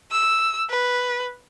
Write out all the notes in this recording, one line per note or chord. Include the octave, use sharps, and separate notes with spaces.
E6
B4